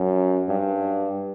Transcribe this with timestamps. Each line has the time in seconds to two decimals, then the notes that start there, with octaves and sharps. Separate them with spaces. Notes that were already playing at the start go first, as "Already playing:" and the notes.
Already playing: F#2
0.49 G2